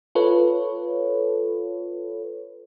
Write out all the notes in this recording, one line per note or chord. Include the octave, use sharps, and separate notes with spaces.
F4 A4 B4 C#5